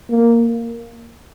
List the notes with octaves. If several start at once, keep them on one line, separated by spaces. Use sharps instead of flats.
A#3